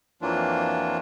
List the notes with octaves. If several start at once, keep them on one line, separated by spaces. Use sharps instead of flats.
F2 E3 F#3 A#3 D4 F4